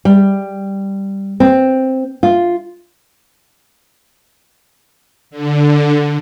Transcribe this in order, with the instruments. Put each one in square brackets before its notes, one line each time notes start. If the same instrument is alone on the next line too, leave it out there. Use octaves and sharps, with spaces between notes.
[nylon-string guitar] G3
C4
F4
[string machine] D3